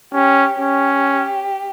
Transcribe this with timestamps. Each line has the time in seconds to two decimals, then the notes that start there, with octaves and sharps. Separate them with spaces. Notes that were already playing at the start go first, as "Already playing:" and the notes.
0.13 C#4 G4
0.60 C#4 G4